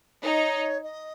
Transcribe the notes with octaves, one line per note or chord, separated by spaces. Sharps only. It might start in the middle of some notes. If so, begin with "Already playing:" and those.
D#4 C#5
D#5